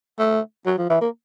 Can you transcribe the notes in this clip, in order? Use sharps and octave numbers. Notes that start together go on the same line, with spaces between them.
A3
F#3
F3
E3
A#3